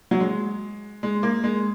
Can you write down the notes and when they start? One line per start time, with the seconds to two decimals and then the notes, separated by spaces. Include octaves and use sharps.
0.11 F#3
0.20 G#3
1.03 G#3
1.23 A#3
1.44 G#3